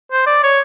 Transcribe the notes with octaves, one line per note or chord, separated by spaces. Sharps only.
C5
D5
C#5